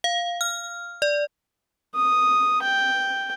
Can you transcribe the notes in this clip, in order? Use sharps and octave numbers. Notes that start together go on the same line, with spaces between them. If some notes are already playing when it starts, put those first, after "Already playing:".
F5
F6
D5
D#6
G5